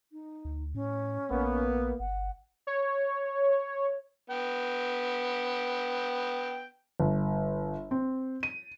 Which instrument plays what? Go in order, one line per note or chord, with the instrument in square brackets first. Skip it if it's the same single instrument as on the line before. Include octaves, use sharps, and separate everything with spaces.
[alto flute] D#4
[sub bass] D2
[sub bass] A2 [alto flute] C#4
[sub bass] A#1 [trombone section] A#3 B3
[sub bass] G1 [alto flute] F#5
[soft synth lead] C#5
[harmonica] B3 G5
[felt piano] G1
C4
D#7